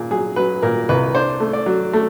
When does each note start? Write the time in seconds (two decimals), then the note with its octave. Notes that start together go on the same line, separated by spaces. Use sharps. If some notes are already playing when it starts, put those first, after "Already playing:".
Already playing: A#2 G#4
0.11 F#3 G#4
0.36 F#3 B4
0.62 A#2 A#4
0.89 C2 B4
1.15 D4 C5
1.40 A3
1.53 D5
1.66 F#3
1.93 A3